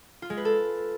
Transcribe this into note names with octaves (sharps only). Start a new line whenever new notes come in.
F4
G#3
B4
A4